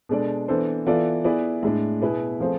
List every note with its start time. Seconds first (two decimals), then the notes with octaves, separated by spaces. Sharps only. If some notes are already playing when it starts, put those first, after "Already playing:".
0.09 B2 G#3 D4 A4 D5
0.48 E3 B3 D4 A4 C5
0.87 E3 B3 F4 A4 D5
1.24 B3 E4 G#4 B4 D5
1.63 A2 G#3 D4
2.01 B2 B3 E4 G#4 B4
2.40 F3 A3 C4 G#4 C5